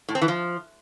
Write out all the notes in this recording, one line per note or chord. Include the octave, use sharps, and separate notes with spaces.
A2
C4
E3
F3